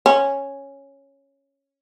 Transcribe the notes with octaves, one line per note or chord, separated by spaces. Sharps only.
C#4